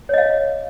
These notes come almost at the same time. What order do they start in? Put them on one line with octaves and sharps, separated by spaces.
C#5 D#5 F5